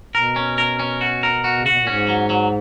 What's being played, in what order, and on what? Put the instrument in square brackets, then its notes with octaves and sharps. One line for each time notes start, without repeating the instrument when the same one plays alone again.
[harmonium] B2 [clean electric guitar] A#4
[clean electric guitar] C#4
A#4
C#4
F#4
A#4
F#4
[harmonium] C#3
[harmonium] B2 [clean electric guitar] F#4
[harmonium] A#2
[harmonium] G#2 [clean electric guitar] C#4
[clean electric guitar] F#3
F#3